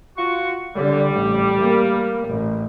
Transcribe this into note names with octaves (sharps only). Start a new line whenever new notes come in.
F4 F#4 C#6
D3 G3
A1
A#3
A1